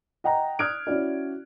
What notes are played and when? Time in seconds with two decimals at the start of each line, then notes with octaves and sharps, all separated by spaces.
0.24 D#5 F#5 G5 A#5
0.59 D#6 F6 F#6 G#6 D7
0.87 C#4 E4 F#4 D5